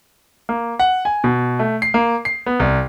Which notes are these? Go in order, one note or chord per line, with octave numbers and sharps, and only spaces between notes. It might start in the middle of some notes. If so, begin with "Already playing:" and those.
A#3
F#5
G#5
B2
A3
C7
A#3
C7
B3
C2